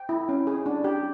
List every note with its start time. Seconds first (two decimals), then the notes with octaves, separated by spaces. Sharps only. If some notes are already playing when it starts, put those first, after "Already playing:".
Already playing: G5
0.09 E4
0.29 C#4
0.47 G#4
0.66 D4
0.84 G4